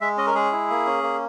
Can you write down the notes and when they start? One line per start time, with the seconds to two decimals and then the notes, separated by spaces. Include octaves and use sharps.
0.01 G#3 E5
0.17 C#4 D#5
0.27 A#4
0.34 G#3 G#4
0.52 E4
0.70 A#3
0.86 C#4
1.03 A#3